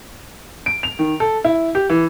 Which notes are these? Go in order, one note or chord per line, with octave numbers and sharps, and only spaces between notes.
D7
F7
D#3
A4
E4
G4
E3